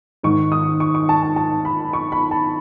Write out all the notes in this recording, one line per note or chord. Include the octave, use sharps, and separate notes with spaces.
G#2 D#3 C#6
D#6
C#6
C#6
A5
A5
A5
B5
C#6
B5
A5